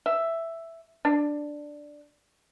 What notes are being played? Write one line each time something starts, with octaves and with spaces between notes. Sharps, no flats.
E5
D4